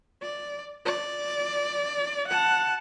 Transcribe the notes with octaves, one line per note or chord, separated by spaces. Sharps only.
D5
D5
F#5 A5